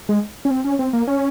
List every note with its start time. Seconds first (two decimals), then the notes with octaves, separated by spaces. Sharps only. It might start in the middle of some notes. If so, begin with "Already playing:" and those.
0.09 G#3
0.45 C#4
0.51 C4
0.65 C#4
0.79 C4
0.93 A#3
1.07 C#4